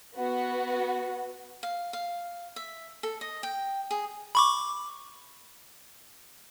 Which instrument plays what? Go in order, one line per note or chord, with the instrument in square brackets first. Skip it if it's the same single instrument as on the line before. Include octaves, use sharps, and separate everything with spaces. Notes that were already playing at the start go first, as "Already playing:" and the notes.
[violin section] B3 F#4
[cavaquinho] F5
F5
E5
A4
D#5
G5
G#4
[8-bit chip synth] B5 C#6 D6